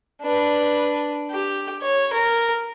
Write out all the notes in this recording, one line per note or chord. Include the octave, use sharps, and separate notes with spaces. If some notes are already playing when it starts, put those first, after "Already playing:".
D4 B4
G4
C#5
A#4